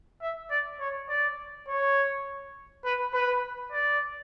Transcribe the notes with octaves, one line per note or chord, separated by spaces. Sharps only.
E5
D5
C#5
D5
C#5
B4
B4
D5